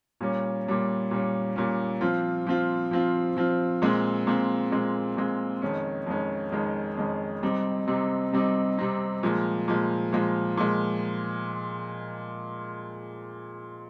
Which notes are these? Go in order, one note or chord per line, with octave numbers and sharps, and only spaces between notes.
A#2 G3 C#4
A#2 G3 C#4
A#2 G3 C#4
A#2 G3 C#4
F3 C4 F4
F3 C4 F4
F3 C4 F4
F3 C4 F4
A#2 G#3 C4
A#2 G#3 C4
A#2 G#3 C4
A#2 G#3 C4
F2 D#3 G#3 C#4
F2 D#3 G#3 C#4
F2 D#3 G#3 C#4
F2 D#3 G#3 C#4
C3 G3 C4 D#4
C3 G3 C4 D#4
C3 G3 C4 D#4
C3 G3 C4 D#4
A#2 F3 G#3
A#2 F3 G#3
A#2 F3 G#3
A#2 F3 G#3